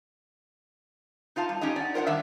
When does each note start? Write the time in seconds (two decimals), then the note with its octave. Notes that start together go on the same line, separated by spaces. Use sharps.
1.36 D#4 F4 F5 A5
1.49 G3
1.61 C#4 D#4 G4 D#5
1.76 D5 F#5
1.94 F4 A#4 C5 F5 F#5
2.06 G2 D#3 D4 E5